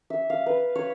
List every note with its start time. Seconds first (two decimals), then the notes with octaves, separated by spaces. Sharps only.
0.10 E5
0.30 F5
0.46 B4
0.76 C#5